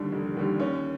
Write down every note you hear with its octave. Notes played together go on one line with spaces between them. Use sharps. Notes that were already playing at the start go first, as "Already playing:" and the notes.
Already playing: D#2 D3 G3
F1
D#2 D3 G3
D#2 C#4